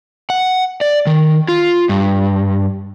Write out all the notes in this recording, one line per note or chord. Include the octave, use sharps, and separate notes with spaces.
F#5
D5
D#3
F4
G2